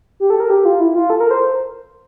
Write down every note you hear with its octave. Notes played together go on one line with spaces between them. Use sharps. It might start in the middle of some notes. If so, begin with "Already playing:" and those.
G4
A4
A#4
G4
F4
E4
F4
A4
A#4
C5